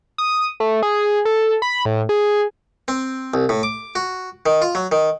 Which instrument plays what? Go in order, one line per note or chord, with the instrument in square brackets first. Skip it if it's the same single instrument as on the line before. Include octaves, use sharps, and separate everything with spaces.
[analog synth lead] D#6
A3
G#4
A4
B5
A2
G#4
[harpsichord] C4
C2
A2
D6
F#4
D#3
F4
F#3
D#3